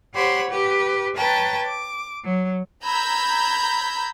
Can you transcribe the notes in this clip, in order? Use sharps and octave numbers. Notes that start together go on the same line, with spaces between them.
G4 C5 C#5 F#5 B5
G4 B4
B4 C#5 G5 A5 A#5
D6
F#3
A#5 B5 E6 G6 G#6